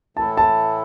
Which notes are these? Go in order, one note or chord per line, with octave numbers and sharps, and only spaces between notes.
A2 E3 A3 E4 A4 A5
A5